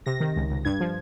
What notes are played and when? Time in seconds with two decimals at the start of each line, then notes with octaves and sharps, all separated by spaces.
0.06 C3 A#6
0.20 D#3
0.36 C#2
0.50 C#2
0.65 G2 G#6
0.80 F3